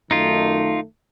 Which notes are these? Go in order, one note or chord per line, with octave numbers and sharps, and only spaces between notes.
F#2 D#3 A3 D#4 F4